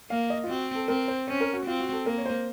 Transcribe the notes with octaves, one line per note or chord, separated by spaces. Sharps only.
A#3 F5
D#5
F4
C4 F#4
A4
C4 A#4
C5
C#4 C5
A#4
F#4
C4 F4
F#4
A4
A#3 A#4
C#5
C5